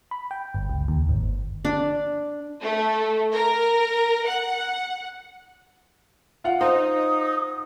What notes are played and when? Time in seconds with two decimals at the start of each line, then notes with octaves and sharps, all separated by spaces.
0.11 B5
0.31 G5
0.55 G1
0.70 C#2
0.88 D#2
1.09 G#1
1.21 G1
1.65 D4
2.62 A3
3.34 A#4
4.26 F#5
6.44 F4 F5 F#5
6.61 D#4 C5 D#6